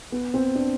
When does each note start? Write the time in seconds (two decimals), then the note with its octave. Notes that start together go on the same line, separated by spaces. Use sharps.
0.12 B3
0.34 C4
0.55 D4